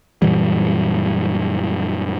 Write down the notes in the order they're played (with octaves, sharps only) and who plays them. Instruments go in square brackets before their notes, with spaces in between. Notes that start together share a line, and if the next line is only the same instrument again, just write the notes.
[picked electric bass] F#2 A#2 E3 G3